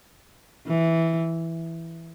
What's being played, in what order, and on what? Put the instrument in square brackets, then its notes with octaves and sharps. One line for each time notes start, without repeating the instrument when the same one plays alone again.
[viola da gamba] E3